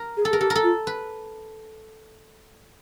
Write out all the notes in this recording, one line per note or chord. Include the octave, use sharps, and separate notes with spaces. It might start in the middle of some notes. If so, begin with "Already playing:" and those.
Already playing: A#4
G#4
A4
G#4 A#4
G4 A4
A#4
A4
F4
B4